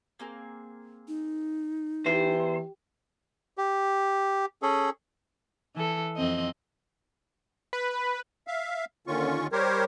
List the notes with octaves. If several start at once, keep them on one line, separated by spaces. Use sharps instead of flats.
A#3 C4 G#4
D#4
E2 E3 G4 C5
G4
C#4 G#4 A4
E3 A4
F2 C4 D#5
B4
E5 F5
D#2 D3 D#3 C#4 F4 C#6
G3 G4 A#4 C5 C#5